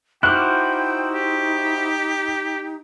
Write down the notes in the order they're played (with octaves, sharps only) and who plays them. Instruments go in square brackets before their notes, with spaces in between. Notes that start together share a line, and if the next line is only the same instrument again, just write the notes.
[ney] D#4 [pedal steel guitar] E4 F#4 C5 [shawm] G5 [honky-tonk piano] D6 F6 F#6
[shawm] G4